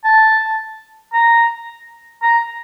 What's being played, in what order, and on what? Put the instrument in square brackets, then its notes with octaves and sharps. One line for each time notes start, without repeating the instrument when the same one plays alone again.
[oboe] A5
A#5
A#5